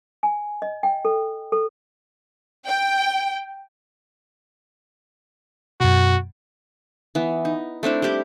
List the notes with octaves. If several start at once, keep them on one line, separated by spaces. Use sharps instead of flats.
G#5
D#5
G5
A4
A4
G5
F#2 B2 F#4
E3 B3
D#4
A3 C4 D4 E4
G3 E4 G4 D6